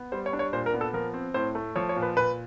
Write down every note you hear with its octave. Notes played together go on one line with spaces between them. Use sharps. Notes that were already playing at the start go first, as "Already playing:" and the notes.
Already playing: B3
G3 C5
C#5
D4
C#5
A#2 C5
A#4
B3
A4
F3 A#4
C4
A2 C5
A3
F3 C#5
C#5
A#2
B4
A#2 B4